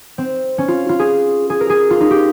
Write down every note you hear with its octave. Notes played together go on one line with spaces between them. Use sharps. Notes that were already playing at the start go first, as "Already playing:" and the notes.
C4
C#4
F4
F4
G#4
G#4
A#4
G#4
F4
D#4
G4